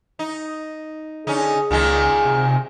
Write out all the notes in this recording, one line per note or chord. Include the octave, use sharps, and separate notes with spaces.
D#4
D3 C#4 D#4 G#4
C#2 A#2 D#3 G#3
C3